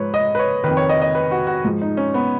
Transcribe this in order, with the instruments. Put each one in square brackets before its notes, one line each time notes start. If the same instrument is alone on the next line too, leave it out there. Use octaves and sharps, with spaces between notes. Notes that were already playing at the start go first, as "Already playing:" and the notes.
Already playing: [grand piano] G#2 F3 B4 C#5
D#5
B4
C#5
F2 D#3 B4
C#5
D#5
D#5
B4
F#4
F#4
G#2 F3
D#4
C#4
B3